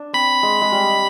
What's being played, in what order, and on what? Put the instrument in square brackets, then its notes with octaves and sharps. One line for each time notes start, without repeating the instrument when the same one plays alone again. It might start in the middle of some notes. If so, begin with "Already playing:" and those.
Already playing: [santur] D4
[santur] C4 [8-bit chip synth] B5
[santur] G#3
G#3
G3